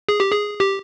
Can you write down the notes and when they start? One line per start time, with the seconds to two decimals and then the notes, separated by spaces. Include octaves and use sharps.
0.09 G#4
0.20 G4
0.32 G#4
0.60 G4